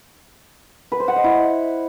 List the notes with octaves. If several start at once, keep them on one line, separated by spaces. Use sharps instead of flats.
B4
C5
F#5
D#5
E4